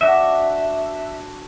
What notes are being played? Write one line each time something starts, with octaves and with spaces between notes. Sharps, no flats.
D4 F#4 E5 D6